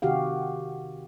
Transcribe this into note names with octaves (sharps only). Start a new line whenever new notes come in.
C3 D#3 F#4 G4 F5